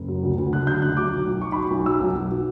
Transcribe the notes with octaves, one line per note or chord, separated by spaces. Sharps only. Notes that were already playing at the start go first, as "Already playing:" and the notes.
Already playing: F#1
F#3
D2
D2
D3 F#6
F#3 G6
D2 F#6
F#3 D6
B1
B1
B2 C#6
B5
F#3 C#6
B1
F#3 E6
B1
B1
B2